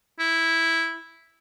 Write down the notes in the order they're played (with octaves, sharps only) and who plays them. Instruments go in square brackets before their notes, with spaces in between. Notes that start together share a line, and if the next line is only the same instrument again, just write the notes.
[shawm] E4